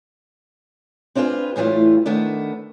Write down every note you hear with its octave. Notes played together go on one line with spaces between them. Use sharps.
C4 D4 F4 G#4 B4
A2 E3 G3 A3 F4
D#3 A3 B3 D4